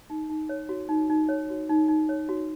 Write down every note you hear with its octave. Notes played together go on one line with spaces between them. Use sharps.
D#4
D#4
C#5
F#4
D#4
D#4
C#5
F#4
D#4
D#4
C#5
F#4